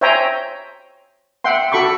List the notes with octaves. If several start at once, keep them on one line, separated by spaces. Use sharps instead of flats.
C5 C#5 E5 G5 G#5 A#5
E5 F#5 G5 C6
F#4 A4 B5 C#6 D6